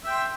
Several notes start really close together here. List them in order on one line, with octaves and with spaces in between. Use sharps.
E5 G5 C6